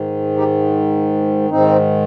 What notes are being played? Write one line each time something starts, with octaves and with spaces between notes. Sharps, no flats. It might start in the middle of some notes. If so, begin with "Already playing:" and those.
Already playing: G#2 D#3
D#4 G4
G#2 D#3 C4 D#4